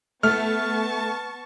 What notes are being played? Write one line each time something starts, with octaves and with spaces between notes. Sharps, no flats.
A3 B3 A5 C#6 F6